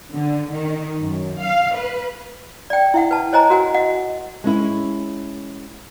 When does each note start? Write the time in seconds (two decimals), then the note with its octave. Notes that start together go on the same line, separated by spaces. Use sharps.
0.12 D3
0.51 D#3
0.98 F#2
1.37 F5
1.74 B4
2.70 D5 G5
2.94 E4 E5 F#5
3.11 B4 A5
3.33 C5 C#5 D#5 G#5 A#5
3.50 F#4 A#4 F#5 G#5
3.74 D#5 F#5
4.44 G#3 C#4 E4